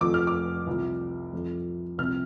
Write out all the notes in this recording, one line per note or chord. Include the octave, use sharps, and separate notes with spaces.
F1 F2 F3 D6
F6
D6
C2 C3 F3
F2 F3
C2 C3 F3 F6